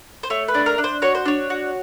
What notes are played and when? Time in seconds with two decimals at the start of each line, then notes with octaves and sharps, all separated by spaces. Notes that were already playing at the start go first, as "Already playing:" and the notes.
0.23 C5
0.30 A3 C#5
0.48 B4
0.54 D4
0.66 A#4
0.78 D4
0.84 C5
1.02 F#4 C#5
1.15 C5
1.26 D4 C#5
1.50 F#4